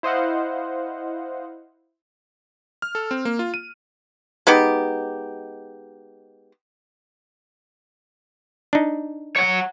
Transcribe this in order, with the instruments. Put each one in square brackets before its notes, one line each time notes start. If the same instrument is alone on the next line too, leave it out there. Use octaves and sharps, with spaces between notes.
[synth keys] E4 C5 D#5 F5 F#5
[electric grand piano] F6
A4
C4
A#3
F4
D#7
[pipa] G#3 B3 D#4 G4
[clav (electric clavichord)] D4 D#4
[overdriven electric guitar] C#5 F#5